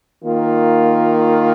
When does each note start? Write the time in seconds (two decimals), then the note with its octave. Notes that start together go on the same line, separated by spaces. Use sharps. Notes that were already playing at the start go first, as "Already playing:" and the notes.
0.23 D#3 A#3 F4